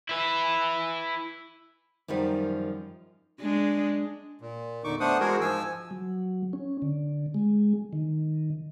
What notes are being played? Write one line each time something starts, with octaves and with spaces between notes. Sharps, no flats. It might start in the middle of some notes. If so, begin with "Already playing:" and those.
E4 B4
F#2 D#3 F3 G3
G#3 D4
A#2
E2 A#2 D3 D#4 C#6 D6
A3 B3 D4 C5 F#5 D#6
E3 G#3 F#4 G#4 A#4 C5
G#2 F3 G#5 E6
F#3
C#4
D3
G#3
D#3